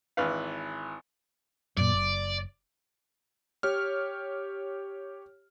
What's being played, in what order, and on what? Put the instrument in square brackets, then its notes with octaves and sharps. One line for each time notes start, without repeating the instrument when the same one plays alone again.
[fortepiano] G#1 E3 B4 F5
[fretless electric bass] F#2 A#2 [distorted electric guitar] D5
[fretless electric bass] F#1
[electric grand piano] G4 C#5 F6